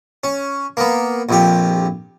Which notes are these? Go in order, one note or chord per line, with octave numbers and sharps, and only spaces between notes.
C#4
A#3 B3
A#1 F2 G4